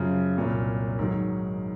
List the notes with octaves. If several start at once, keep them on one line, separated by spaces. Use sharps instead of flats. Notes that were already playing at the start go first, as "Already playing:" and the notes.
Already playing: F#2 C#3 F3
C2 A#2 F#3
G#2 D#3 F#3